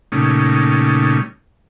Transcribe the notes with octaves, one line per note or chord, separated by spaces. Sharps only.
A#2 C#3 G3 A3 C#4 D#4